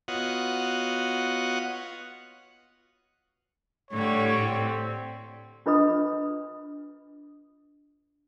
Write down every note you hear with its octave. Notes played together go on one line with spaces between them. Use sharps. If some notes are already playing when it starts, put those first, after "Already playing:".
B3 F4 F#4 C#5 D#5 F#5
A2 D3 G3 C#5
C4
D4 F4 B4 D#5 B5 D#6